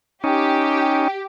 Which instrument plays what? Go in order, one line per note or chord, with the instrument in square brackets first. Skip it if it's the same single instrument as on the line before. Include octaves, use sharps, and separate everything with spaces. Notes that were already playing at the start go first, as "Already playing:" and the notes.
[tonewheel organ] C#4 D#4 [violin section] G4